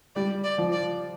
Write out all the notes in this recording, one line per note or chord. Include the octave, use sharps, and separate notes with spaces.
G3 D5
D5
F3
D5